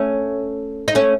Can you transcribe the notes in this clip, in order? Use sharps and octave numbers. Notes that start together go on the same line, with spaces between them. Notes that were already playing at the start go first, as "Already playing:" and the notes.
Already playing: A3 C#4
D#4
A3 C#4